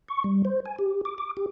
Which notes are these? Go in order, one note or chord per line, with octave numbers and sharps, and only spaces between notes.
C#6
G3
C5
G#5
G4
D6
D6
G4